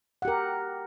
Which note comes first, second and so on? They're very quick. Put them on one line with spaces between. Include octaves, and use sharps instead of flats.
F#5 G4 A#4